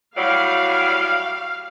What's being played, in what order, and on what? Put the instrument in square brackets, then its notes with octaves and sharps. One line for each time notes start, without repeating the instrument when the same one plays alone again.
[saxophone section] A2 F#3 G3 [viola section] F5